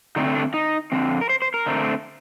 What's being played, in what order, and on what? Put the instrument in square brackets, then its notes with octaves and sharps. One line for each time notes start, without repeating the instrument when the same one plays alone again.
[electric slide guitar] D3 A3 C4 D#4
D4
D#4
F2 D3 F3 C4
A#4
C5
C5
A#4
D3 A3 C4